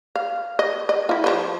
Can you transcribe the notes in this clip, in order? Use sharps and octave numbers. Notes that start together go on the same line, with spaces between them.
F5
D#5
D#5
E4 F4
F3 C5 D#5